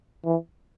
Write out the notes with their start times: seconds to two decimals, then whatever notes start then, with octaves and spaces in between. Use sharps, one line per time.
0.25 E3